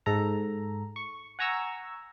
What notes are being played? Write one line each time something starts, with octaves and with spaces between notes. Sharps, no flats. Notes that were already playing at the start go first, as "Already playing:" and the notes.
G#2 A4 A#5
C#6
F#5 G#5 A#5 C#6 E6